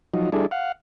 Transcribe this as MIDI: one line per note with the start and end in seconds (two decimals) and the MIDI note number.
0.14 0.30 53
0.14 0.30 54
0.14 0.30 63
0.32 0.46 55
0.32 0.46 62
0.32 0.46 64
0.32 0.46 68
0.32 0.46 69
0.51 0.72 77
0.51 0.72 78